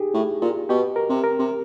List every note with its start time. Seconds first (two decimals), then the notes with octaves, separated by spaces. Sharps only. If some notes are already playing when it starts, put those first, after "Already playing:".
Already playing: D#4 G4 G#4
0.14 A2
0.42 A#2
0.69 B2 G4
0.96 A#4
1.09 C3
1.24 A#4
1.39 C3